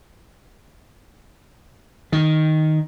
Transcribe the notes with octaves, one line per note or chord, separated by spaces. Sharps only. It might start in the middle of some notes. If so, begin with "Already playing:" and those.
D#3